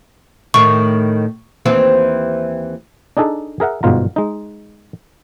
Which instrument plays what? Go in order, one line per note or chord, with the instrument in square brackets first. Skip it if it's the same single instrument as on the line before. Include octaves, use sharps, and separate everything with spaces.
[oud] A2 D#3 [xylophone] C#6
[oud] D#2 E3 C4
[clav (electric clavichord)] D4 D#4 G#4 A4
G#4 A#4 E5 F#5
G1 G#2 B2 F4 A#5
G#3 D#4